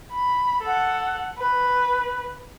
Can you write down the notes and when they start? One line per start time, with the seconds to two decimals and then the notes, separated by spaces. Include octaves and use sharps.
0.12 B5
0.62 A4 F#5
1.38 B4